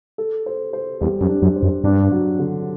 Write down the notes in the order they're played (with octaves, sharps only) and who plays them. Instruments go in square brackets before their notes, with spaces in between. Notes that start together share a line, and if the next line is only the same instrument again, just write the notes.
[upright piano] A4
C5
C5
[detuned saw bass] E2 [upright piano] G3
[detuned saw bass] F#2
[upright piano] D4
[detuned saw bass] F#2
[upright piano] C5
[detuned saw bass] F#2
[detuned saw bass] G2 [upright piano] D4
[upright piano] F#3
D3